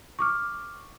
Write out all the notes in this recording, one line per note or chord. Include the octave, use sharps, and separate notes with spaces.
C#6 D6 F6